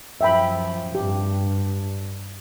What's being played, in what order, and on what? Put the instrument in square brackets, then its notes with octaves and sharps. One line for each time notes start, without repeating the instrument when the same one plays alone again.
[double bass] F#2 F3 [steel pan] E5 G5 B5
[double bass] G2 [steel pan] G4